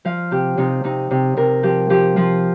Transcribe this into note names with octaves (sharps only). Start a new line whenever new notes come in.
F3 F5
C3 G4
C3 D#4
C3 D#4
C3
C3 A#4
F3 G4
F3 G4
F3 F4